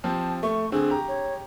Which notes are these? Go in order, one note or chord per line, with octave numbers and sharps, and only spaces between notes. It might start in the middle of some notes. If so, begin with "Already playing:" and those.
F3 C4 G4 A5
A3 C#6
D3 C4 G#4
G4 A#5
C#5